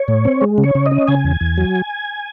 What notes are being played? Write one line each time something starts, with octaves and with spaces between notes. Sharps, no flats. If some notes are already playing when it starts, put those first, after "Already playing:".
Already playing: C#5
A2
C4
G#3
C#3
C#5
C#3
D#5
C#4
C#3 G#5
E2
E2
F#3